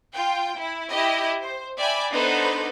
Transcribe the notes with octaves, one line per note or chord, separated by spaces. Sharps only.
F4 G5
E4
E4 G4 D#5
C5
D5 E5 G5 G#5 B5
B3 D4 D#4 A4 B4 C5